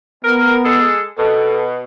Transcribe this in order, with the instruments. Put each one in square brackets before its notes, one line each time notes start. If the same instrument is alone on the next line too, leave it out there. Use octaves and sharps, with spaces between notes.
[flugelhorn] B3 [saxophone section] A#4
[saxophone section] G#3 G#4 A4
[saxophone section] B2 [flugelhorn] A4